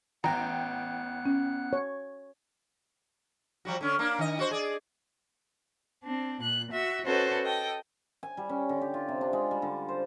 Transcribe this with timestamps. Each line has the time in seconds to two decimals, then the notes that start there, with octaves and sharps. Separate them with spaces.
0.24 A1 B3 F#5 G5 A#5 F#6
1.26 C#4
1.73 C#5
3.65 F3 G3 F#4
3.81 D3 C#4
3.99 A#3 D4
4.19 D#3 D#5
4.39 F#4 C5
4.51 G#4 D5
6.03 C4 D4
6.41 A#2 F#6
6.72 F#4 E5
7.05 C#4 F#4 A4 B4 C5 D#5
7.45 A4 D#5 G5
8.23 G#5
8.37 G3
8.49 C#4
8.69 D3
8.81 G4
8.94 F4
9.08 C3
9.21 D4
9.33 G#3
9.51 G3
9.62 D3
9.88 C5